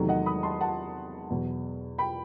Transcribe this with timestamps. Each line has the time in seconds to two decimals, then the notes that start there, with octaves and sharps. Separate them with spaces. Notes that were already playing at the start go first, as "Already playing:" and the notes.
Already playing: E2 C3 D#3 F#3 A3
0.09 D#5 F#5
0.26 B5 D#6
0.43 A5 C6
0.61 F#5 A5
1.30 E2 B2 F#3
1.98 G5 B5